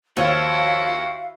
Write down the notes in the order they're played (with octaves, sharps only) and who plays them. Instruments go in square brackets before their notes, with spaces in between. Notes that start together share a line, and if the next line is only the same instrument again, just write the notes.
[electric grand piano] D#2 C#5 [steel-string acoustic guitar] F3 [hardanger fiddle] E4 F#4 [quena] F5